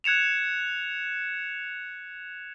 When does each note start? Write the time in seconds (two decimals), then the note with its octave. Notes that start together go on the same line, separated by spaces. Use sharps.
0.04 F#6 G#6 C#7 E7 F7